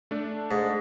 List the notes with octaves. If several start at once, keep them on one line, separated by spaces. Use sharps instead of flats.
A3 D4
G#2